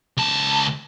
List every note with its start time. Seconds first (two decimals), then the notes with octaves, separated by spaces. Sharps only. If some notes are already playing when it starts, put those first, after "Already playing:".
0.17 C#2 A5